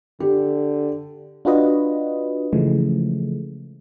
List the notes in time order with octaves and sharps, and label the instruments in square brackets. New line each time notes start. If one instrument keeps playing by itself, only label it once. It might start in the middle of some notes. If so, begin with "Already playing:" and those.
[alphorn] D3 [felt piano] G4
[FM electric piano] D4 F4 F#4 B4 D#5
C#3 E3 F3 G#3 A3